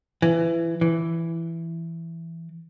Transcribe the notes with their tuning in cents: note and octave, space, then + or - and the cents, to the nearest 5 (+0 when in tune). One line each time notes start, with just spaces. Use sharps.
E3 +20
E3 +10